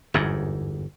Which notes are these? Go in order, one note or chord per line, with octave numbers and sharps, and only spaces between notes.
G1 E2 G#2